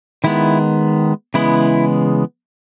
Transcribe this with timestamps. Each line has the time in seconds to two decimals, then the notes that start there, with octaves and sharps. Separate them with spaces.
0.24 D#3 G#3 B3 E4
1.34 C#3 E3 G#3 B3 E4